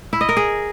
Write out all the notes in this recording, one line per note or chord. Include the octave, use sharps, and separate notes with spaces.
E4
D#5
A#4
G#4